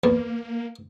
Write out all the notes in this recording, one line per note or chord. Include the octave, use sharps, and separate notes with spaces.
E2 A#3